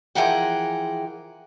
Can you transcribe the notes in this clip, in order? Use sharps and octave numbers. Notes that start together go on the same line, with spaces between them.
E3 F3 G#4 A#4 F#5 G5